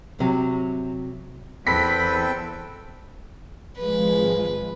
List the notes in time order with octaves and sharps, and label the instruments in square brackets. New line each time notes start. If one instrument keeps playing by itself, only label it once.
[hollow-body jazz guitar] C3 F#3
[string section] E2 [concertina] C4 A4 G5 [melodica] B4 B5 [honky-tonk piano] B6
[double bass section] G#1 F3 G#3 [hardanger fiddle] B4